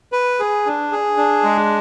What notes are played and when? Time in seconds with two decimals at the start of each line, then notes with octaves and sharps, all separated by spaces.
0.12 B4
0.40 G#4
0.66 D4
0.92 G#4
1.17 D4
1.43 G#3